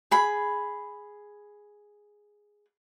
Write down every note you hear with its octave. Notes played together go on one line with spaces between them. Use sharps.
G#4 B5